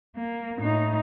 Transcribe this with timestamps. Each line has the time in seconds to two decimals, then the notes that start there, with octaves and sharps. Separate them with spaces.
0.16 A#3
0.59 A2 D#4